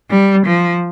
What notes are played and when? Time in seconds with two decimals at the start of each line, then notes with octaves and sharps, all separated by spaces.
0.10 G3
0.46 F3